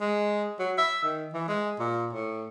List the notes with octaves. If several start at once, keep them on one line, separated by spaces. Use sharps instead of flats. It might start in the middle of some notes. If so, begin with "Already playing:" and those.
G#3
F#3
E5
D#3
E3
G#3
A#2
A2